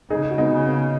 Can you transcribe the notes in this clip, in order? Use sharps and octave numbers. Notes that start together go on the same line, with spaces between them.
C#3 D#4 G#4
G#4
F#4
B3 D#4
C#3
B3